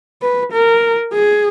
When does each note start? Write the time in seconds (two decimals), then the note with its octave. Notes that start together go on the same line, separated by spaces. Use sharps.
0.22 B4
0.52 A#4
1.13 G#4